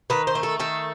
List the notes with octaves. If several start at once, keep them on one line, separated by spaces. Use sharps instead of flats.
D#3 B4
C5
A3
A4
D#3 A4